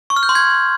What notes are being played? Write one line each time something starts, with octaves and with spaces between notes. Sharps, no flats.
C#6
F6
G6
C6
G#6